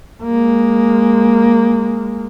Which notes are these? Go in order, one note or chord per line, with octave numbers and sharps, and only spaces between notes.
G#3 A#3